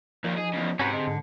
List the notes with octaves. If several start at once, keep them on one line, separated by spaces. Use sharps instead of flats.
D#2 A#2 D#3 F3
D#4 G#4
E2 C#3
G#2 C3 C#4 F#4 B4
D3 G#3
G#2